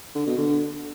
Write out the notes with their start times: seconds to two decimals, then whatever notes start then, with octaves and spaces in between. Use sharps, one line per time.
0.15 D3
0.27 B2
0.38 D3